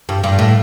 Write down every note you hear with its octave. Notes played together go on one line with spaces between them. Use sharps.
G2
G2
A2